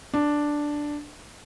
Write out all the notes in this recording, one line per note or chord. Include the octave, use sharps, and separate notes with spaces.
D4